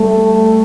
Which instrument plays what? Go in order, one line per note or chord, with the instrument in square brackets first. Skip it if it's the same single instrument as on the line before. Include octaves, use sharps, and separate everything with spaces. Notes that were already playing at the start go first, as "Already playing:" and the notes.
Already playing: [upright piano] G3 [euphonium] A3